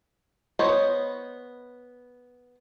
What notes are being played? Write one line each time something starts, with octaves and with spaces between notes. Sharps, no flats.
B3 C5 C#5 D#5